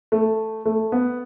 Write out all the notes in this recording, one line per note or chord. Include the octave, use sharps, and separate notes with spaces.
A3
A3
B3